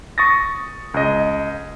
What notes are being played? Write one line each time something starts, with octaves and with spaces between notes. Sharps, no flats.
C#6 D#6 A6 A#6
C#2 D#5